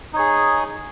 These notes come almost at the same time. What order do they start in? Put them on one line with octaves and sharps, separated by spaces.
D#4 C#5 G#4